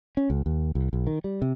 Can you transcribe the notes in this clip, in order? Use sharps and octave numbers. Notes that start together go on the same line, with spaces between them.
C#4
C#2
D#2
C2
B1
D#3
G3
C3